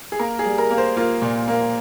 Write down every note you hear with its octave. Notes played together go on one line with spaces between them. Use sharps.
G#4
A#3 A#4
G#4
G3
A#4
A#3
C5
A#3 F4
A#2
A#3